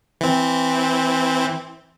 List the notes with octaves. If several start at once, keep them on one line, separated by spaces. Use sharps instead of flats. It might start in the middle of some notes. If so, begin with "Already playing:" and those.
E3 C4